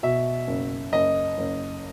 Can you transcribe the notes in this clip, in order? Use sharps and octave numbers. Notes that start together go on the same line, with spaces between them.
B2 E5
F#1
F#1 D#5
F#1